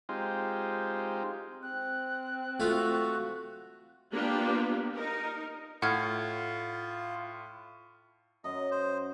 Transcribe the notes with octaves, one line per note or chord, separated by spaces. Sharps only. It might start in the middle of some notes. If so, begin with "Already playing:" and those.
G#3 C4 D#4 F4 G4
C4 F#6
A3 F4 F#4
A#3 B3 D4 F4 G4
D#4 A#4
A2 F4 F#5 F6 G#6
F#2 D#5
C5